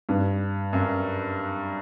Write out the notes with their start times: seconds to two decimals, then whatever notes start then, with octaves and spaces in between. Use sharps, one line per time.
0.09 G2
0.73 F#2